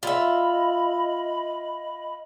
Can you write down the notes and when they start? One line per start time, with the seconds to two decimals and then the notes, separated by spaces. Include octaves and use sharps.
0.03 F4 D#5 E5 B5